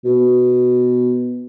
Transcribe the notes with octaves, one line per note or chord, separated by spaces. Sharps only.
B2